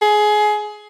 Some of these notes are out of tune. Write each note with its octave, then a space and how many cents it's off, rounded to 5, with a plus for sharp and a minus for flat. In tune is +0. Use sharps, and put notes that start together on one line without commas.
G#4 +20